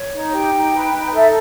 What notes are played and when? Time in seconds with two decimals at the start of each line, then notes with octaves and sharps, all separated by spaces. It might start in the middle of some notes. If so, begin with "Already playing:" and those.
Already playing: C#5
0.12 D#4
0.32 G4 G5
0.53 D#4
0.73 B4
0.94 D#4
1.14 A4 E5